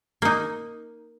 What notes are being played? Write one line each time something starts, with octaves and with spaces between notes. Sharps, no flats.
A#3 D#4